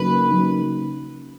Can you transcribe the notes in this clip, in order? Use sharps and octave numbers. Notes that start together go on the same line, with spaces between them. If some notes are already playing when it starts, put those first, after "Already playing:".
Already playing: C#3 F#3 A#3 D#4 B4
C#3 F#3 A#3 D#4